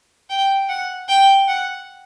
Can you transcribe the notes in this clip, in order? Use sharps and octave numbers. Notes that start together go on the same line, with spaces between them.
G5
F#5
G5
F#5